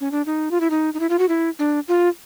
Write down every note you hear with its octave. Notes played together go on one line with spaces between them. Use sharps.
C#4
D4
D#4
F4
E4
D#4
D#4
E4
F4
F#4
E4
D4
F4